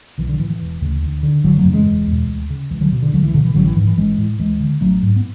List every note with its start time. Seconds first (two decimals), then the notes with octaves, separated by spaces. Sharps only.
0.18 B1 E3
0.28 D3
0.39 A2 E3
0.50 E3
0.61 E1
0.81 D2 C#3
1.03 D2
1.23 D3
1.44 F#1 D3 F#3
1.58 F#3 A3
1.65 F#2 C#3
1.73 E3 G#3
1.86 E1
2.07 E2 B2
2.28 D2
2.50 C#3
2.70 C#2 E3
2.81 D3 F#3
2.92 B2
3.02 D3
3.13 C#2 D3 F#3
3.23 E3
3.34 B2 D3
3.45 E3
3.54 A1 D3 F#3
3.65 E3
3.77 G#2 E3
3.87 E3
3.97 A1 E3 G#3
4.18 A2
4.39 D2 E3 G#3
4.60 D3
4.81 A1 F#3 A3
5.02 G#2
5.16 B3